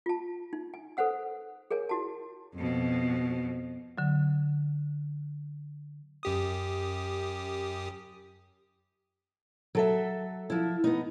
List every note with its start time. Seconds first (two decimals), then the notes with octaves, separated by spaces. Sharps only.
0.06 F4 A5
0.53 D#4
0.74 G#5
0.97 A4 B4 C5 F#5 E6
1.71 G#4 A#4 C#5 G#5
1.89 E4 F#4 A5
2.55 F2 B2
3.98 D3 F#3
6.23 F#2 G4 D#6
9.75 F#3 A4 E5
10.50 F3 E4
10.84 B3 D#4